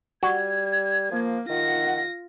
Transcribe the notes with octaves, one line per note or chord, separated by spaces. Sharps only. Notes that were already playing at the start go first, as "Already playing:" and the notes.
G3 F#4 G#6
F3 A#3
D#3 F4 F#5 A#6